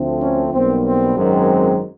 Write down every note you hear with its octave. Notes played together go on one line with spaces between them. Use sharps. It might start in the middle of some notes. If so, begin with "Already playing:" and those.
Already playing: D2 D3 F3 A3 C4
C#4
B1 B2 G3 A#3 C4
C4
G#1 F#2 D#3 G#3 C4